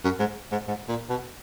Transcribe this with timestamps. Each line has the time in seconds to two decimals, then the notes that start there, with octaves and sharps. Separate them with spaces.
0.04 F#2
0.19 G#2
0.52 G#2
0.67 G#2
0.88 A#2
1.09 B2